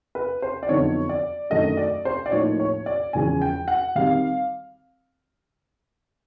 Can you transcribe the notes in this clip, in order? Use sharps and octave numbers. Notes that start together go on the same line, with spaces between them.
B4
C5
D5
F2 D3 F#3 B3 D#4 C#5
D5
F#2 D#3 F#3 A3 D4 D#5
D5
C5
D5
A2 F3 A#3 D#4 C#5
C#5
D5
E2 C#3 F3 G#3 C#4 G#5
G5
F#5
D#3 G3 C4 F5